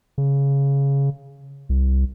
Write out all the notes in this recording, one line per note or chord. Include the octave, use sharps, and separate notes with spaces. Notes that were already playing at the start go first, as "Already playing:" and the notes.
C#3
C2